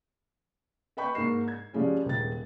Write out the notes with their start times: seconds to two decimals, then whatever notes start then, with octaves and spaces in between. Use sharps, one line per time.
0.97 B4 D#5 G5 B5 C#6 G6
1.15 G#2 A#3 A#4 C#6 C7 E7
1.48 G#6
1.73 F3 G3 G#3 C#4
2.05 D#1 G#3 A6